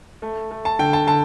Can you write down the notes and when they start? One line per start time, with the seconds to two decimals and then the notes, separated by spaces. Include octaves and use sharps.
0.22 A3
0.51 A3
0.65 A5
0.79 D3 G5
0.93 A5
1.07 D3 A5